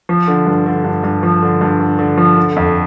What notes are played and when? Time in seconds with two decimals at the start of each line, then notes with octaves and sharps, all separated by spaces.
0.09 F3
0.28 D3
0.46 G2
0.66 D3
0.84 G2
1.04 G2
1.23 F3
1.42 D3
1.61 G2
1.80 D3
1.99 D3
2.18 F3
2.37 D3
2.56 F2